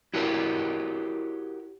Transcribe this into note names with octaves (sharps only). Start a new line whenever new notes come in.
E4 F#4 G4 A#4 C#5